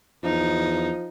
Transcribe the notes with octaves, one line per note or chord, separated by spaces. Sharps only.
E2 F3 D#4